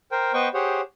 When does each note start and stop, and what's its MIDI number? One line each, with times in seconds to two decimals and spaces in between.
0.12 0.33 70
0.12 0.33 72
0.12 0.33 79
0.34 0.48 59
0.34 0.48 71
0.34 0.48 72
0.34 0.48 75
0.34 0.48 79
0.34 0.48 85
0.54 0.81 67
0.54 0.81 68
0.54 0.81 72
0.54 0.81 73
0.54 0.81 78